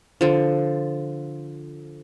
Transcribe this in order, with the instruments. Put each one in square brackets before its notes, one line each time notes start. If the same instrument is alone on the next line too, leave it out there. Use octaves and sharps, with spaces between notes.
[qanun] D3 F3